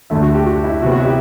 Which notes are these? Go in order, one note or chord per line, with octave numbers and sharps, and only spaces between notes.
D2 D3 A3 E5
F#4
G4
F#4
E4
C3 F#3 B3 F#4
F#4
E4 G4